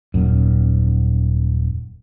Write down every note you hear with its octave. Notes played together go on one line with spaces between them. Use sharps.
D#1 F#2